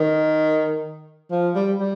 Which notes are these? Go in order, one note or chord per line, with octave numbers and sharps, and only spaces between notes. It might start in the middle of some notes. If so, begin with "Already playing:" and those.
Already playing: D#3
F3
G3
G3